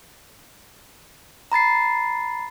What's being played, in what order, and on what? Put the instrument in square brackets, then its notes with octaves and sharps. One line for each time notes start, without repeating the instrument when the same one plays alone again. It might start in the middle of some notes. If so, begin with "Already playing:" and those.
[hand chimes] A#5 B5 A6 C7